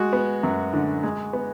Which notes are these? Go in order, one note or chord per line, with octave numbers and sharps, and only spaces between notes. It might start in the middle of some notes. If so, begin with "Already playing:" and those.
Already playing: G#3 F#4
B3
F#2
D3
G#3
B3